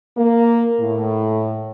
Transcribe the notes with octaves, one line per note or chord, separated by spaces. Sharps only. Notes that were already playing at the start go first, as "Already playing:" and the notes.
A#3
A2